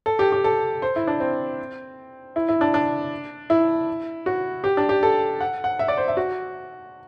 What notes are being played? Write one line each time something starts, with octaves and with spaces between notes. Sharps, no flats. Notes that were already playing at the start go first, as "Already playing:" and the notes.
A4
G4
G4
A4
C5
E4
D4
C4
E4
E4
D4
D4
E4
F#4
G4
D4
G4
A4
F#5
F#5
E5
D5
C5
E5
F#4